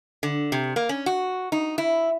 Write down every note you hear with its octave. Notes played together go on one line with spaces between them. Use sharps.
D3
C3
A#3
C#4
F#4
D#4
E4